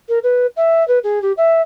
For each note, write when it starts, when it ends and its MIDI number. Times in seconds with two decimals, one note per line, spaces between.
0.09 0.19 70
0.23 0.47 71
0.57 0.86 76
0.88 0.99 71
1.04 1.22 68
1.22 1.32 67
1.37 1.62 76